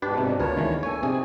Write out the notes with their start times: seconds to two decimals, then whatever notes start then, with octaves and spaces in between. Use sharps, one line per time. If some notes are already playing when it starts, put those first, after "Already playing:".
0.02 G#2 B2 D4 G4 B4
0.18 C3
0.40 D2 F4 A#4 B4 C#5 A5
0.57 D#3 E3 G#3 B3
0.83 A#3 A4 C#5 G#5
1.03 C3 C4 D#4 G#4 D5